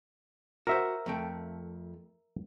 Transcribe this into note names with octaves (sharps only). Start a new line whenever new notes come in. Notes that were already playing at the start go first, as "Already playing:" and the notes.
F#4 A#4 C5 E5
F2 A3 G5